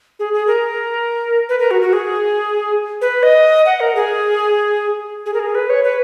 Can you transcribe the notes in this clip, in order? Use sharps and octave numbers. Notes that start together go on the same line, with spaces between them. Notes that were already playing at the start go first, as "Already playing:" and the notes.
G#4
G#4
A#4
B4
A#4
F#4
F#4
G#4
B4
D#5
F#5
A#4
G#4
G#4
A#4
G#4
B4
C#5
B4